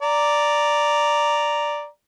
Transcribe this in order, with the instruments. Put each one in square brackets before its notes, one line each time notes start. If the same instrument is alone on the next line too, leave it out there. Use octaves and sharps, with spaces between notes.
[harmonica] D5 A#5